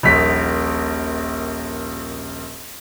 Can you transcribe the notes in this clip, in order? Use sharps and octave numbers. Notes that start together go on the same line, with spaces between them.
D#1 A#1 B6